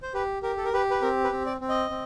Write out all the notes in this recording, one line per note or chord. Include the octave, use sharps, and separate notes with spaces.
C5
G4 B4
G4 A#4
A4
A#4
G4 B4
B4
C4 A#4
B4
C4
D5
C4
D#5
C4